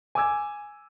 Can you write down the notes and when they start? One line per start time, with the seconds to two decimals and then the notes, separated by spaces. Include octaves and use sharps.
0.15 G#5 D6 E6 G#6